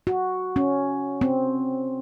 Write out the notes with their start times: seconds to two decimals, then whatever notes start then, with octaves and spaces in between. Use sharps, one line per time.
0.07 F#4
0.56 C#4
1.21 C4